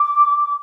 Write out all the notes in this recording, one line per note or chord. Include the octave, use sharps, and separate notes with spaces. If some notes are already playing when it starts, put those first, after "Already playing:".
Already playing: D6